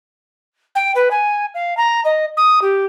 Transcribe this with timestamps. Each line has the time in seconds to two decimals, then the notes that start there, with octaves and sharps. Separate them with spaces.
0.75 G5
0.95 B4
1.11 G#5
1.54 F5
1.77 A#5
2.04 D#5
2.37 D#6
2.61 G4